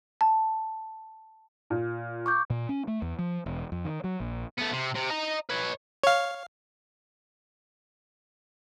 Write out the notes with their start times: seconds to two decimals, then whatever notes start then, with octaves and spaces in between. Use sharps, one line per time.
0.21 A5
1.70 A#2
2.26 C#6 D6 G6
2.50 A#2
2.69 C#4
2.87 A3
3.02 E2
3.19 F3
3.46 E1
3.72 F2
3.85 D#3
4.04 F#3
4.20 A#1
4.59 A3 B3
4.73 C3
4.95 C3
5.10 D#5 A#5
5.49 B4 C#5
6.04 C#5 F5